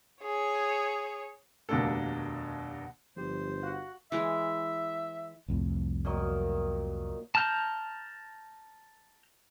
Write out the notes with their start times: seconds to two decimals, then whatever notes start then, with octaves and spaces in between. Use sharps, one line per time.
0.23 G#4 C#5
1.69 F1 D#2 B2 A#3 D4 A4
3.16 G1 F3 G4 C5
3.63 F#4 F5 F#5 F#6
4.12 E3 G#3 C#5 E5
5.48 C2 F2 A2
6.05 A#2 D#3 F#3
7.35 A5 A#5 F6 G6